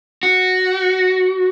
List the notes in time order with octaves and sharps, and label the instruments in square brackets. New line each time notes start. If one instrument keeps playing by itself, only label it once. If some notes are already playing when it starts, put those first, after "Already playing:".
[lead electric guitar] F#4